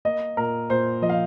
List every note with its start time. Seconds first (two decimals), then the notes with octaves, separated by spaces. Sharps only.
0.05 A#3 D#5
0.37 A#2 A#4
0.70 A#2 C5
1.02 F3 D#5
1.09 F5